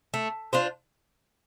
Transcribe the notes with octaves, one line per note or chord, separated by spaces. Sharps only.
A3
D4 F4 C5